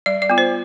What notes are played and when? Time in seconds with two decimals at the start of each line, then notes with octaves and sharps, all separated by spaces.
0.06 G3 D5
0.22 D5
0.30 B3 F4
0.38 C5